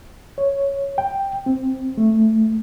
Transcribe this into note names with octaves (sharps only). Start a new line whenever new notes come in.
C#5
G5
C4
A3